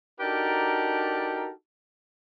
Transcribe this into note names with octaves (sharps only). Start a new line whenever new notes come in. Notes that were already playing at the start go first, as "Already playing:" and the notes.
D4 D#4 F#4 G4 A4 A#4